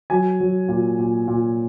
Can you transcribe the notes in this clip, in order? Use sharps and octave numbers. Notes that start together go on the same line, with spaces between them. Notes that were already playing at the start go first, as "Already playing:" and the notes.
F#3 G#5
F#3
A#2
A#2
A#2